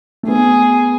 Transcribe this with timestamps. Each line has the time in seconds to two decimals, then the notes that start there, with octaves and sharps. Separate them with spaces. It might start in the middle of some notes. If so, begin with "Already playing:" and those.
0.23 A3
0.28 B3 G#4